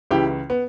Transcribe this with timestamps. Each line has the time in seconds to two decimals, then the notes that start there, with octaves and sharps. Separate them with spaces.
0.11 C#2 C#3 E3 E4 G4
0.50 B3